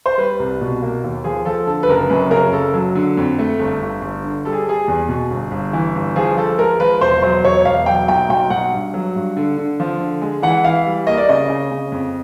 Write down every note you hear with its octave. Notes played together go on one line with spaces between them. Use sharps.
C5
G3 B4
C2
B2
A#3
D#2
F3 G#4
F3 A4
D3 A4
B4
F#1 A#4
F#2 B4
C#3 A#4
F#1 A4
F#3
D3
F2
A3
G1
G1
G1
D3
G3 A4
G#4
G3 G#4
E2
B2
G1
G1
E3
G1
F3 G#4
F3 A4
G#3 A#4
F3 B4
E1 C5
F#3 C5
E1 C#5
E1 F5
F#3 G5
B1 G5
B1 G5
B1 F#5
G2
F#3
G2
D3
D3
F3
D3
G#3
E3 F#5
E3 F5
G3
A#3 D#5
D5
C#3 D#5
C#3
C#3
F2